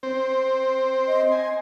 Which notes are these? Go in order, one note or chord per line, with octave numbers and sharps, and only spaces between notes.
C4 C5
D#5
G#5 C6